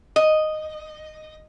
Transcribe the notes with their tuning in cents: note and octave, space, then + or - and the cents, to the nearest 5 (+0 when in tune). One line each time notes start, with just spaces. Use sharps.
D#5 -5